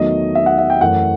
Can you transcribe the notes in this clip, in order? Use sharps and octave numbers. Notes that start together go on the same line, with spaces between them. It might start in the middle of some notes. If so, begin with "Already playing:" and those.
Already playing: E2 D#3 F#3 A3 D#5
E5
F#5
E5
G5
F#2 E3 A3 F#5